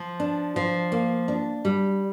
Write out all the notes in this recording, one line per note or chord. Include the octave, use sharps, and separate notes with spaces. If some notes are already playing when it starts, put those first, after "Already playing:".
Already playing: F3
D4
F3
A#3
D4
G3